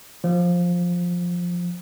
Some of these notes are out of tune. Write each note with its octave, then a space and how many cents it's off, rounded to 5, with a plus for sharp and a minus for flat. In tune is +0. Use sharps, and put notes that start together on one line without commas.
F3 +10